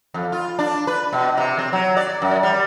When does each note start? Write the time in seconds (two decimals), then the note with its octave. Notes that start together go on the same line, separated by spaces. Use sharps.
0.14 F2
0.32 F4
0.59 D4
0.87 B4
1.13 B2
1.37 C3
1.59 C4
1.73 F#3
1.97 D5
2.22 F#2
2.43 G3